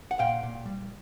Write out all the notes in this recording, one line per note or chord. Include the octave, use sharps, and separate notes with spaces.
F#5
A#2 F5 G5
A#2
G3